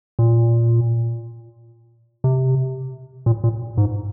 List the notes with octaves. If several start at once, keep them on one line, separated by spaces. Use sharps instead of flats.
A#2
C3
A#2
A#2
G#2